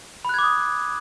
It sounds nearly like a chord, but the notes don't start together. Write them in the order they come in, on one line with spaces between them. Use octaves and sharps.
B5 F#6 G#6 D6 D#6